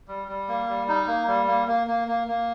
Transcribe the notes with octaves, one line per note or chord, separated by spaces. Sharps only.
G3
G3
A#3
G3
D#4
A#3
G3
A#3
A#3
A#3
A#3
A#3